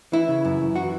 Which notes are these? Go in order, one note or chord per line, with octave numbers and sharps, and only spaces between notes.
E3 E4
C#3
F#2
F#2
E3 F#4